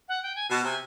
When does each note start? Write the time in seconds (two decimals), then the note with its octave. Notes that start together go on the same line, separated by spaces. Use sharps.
0.09 F#5
0.23 G5
0.36 G#5
0.50 B2 A5
0.64 C3 G#5